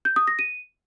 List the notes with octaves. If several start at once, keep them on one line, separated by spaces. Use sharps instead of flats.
G6
D#6
A#6
D#7